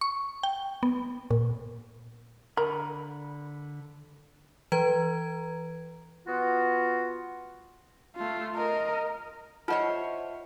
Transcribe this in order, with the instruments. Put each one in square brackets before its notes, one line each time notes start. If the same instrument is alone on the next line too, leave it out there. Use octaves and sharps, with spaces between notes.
[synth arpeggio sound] C#6
G5
B3
A#2
[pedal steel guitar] D3 B5 [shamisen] A#4
[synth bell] E3 B4 A#5 G#6
[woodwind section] B3 F4 F#4
[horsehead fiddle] A3 F4
A#4 D#5
[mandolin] E4 C5 C#5 [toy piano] F4 A5 [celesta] D#5 F#5 F6